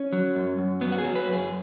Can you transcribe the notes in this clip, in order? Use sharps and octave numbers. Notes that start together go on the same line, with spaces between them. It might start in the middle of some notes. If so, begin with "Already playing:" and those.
Already playing: C#4
F#3
F#2
F#2
F#3 B3
F#4
G#4
F#3
B4
F#2
G#4